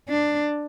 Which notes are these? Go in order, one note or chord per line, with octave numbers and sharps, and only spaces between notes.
D4